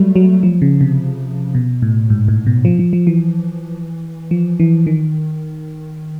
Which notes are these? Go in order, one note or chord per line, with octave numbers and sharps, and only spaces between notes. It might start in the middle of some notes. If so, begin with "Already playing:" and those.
Already playing: F#3 G3 A3
F#3
F3
C#3
C3
B2
A2
G#2
A2
B2
F3
F3
F3
E3
F3
E3
D#3